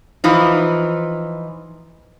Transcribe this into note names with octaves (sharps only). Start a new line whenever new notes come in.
E3 F3 D#4